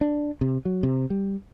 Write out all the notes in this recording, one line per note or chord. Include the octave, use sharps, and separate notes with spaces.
D4
C3
F#3
C3
G3